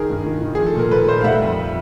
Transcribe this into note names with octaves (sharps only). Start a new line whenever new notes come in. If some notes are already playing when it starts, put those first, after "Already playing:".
Already playing: D#3 G#4 A#4
G2
D#3
D#3
F3 G#4
A4
A#2 A#4
A#2 A4 B4
A3 A#4 C5
F5
G3 E5 F#5
F2